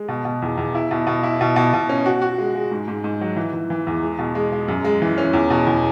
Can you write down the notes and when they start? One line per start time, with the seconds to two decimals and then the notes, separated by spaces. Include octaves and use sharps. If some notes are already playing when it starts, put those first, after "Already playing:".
Already playing: G#3
0.08 B2
0.25 B2
0.42 E2
0.57 E2
0.75 E4
0.91 B2
1.07 B2
1.23 E4
1.41 B2
1.56 B2
1.74 B2
1.89 C#4
2.06 F#4
2.22 F#4
2.38 G#3
2.55 G#3
2.71 G#2
2.88 G#2
3.04 G#2
3.21 F#3
3.36 E3
3.53 E3
3.70 E3
3.87 E2
4.03 G#3
4.19 B2
4.35 G#3
4.52 G#3
4.68 F#2
4.84 G#3
5.02 E3
5.18 C#4
5.33 E2
5.50 B2
5.66 E2